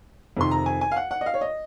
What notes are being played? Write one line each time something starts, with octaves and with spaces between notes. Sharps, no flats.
F2 C3 D#3 C6
A#5
G#5
G#5
F5
F#5
F#5
D#5
F5
C#5
D#5